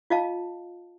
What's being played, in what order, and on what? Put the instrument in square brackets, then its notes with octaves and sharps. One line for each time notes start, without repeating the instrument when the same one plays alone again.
[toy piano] F4 D#5 F5 A5